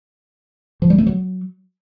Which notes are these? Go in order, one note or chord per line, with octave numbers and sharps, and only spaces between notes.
F3
G3
A3
F#3